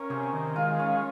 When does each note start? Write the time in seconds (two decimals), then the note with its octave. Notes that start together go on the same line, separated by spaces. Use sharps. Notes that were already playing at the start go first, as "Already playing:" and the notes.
Already playing: C#4 A#4
0.10 C3 G#4
0.33 D#3
0.56 G#3 F4
0.79 C#4 F4